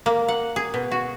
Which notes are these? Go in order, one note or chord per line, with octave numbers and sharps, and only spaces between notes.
A#3
F#5
G#4
B2
F#4